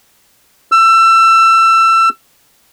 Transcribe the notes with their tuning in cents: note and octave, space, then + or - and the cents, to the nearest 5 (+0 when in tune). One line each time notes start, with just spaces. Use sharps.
E6 +25